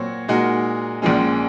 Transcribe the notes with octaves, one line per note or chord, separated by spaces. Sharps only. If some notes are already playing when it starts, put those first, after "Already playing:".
Already playing: A#2 F#3 C4 F#4 C#5
A#2 G#3 D#4 F#4 A#4
A#1 A#2 F3 G#3 C#4